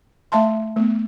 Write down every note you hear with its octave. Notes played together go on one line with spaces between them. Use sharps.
A3 E5 F5 A5 C6
A3 B3